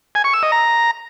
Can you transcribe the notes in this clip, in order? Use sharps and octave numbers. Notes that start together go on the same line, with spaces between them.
G#5
C#6
E6
D#5
A#5